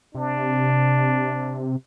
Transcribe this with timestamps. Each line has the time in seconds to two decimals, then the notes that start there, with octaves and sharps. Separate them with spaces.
0.15 C3 D4